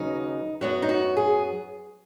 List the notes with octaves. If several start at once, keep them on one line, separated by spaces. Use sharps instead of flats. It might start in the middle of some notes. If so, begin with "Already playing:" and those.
Already playing: D#2 C#3 F#3 B3 D#4
F#2 F#3 B3 F#4
D#4
F#4
G#4